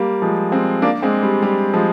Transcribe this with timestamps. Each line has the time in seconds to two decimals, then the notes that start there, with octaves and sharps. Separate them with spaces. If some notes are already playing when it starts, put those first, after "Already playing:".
Already playing: G3 A#3
0.22 F3 G#3
0.52 G#3 C4
0.82 A#3 D4
1.02 G#3 C4
1.23 G3
1.42 G3
1.73 F3 G#3